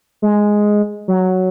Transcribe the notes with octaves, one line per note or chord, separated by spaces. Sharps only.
G#3
F#3